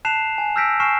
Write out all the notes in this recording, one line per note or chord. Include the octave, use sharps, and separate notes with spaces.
A5 F#6 C7 E7 F7
G#5
E6 F6 G6 A#6 B6 D7
G#5 C#6 F6 C7 E7